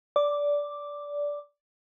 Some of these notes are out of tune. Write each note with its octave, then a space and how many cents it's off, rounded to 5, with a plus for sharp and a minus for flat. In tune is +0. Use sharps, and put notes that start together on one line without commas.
D5 -15 D6 +0